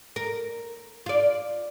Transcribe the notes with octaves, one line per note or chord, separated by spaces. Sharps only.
A#4
F4 D5